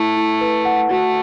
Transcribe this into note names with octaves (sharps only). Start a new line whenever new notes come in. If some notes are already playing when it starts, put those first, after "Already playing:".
Already playing: A3 E4
E4
B4
F#5
A3 F#4